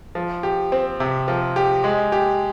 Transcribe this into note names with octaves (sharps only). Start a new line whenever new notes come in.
F3
G4
C4
C3
F3
G4
G#3
G4